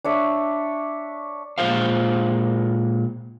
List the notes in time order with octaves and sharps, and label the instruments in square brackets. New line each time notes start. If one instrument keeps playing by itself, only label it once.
[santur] D4 C#5 E5
[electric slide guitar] A#2 G#3 F4 A4 C5 F5